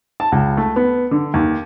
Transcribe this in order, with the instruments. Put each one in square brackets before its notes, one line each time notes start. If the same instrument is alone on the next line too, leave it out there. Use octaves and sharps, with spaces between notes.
[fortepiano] A5
C#2
A3
B3
D3
D#2